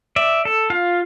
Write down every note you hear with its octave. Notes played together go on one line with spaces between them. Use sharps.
D5 E5
A4
F4 F5